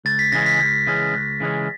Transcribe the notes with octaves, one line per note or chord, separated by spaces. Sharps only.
C#2 A6
B6
C#3 E3 G#3 C#4 A#6
B6
C#2
C#3 E3 G#3 C#4
C#2
C#3 E3 G#3 C#4